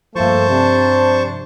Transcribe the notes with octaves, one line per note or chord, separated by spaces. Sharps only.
G2 F3 A3 A#3 A4 C5 A5 C#6
C3 D4